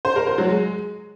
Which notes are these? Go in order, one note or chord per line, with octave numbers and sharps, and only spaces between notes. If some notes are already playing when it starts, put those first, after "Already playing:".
C5
A#4
C5
F#3
G#3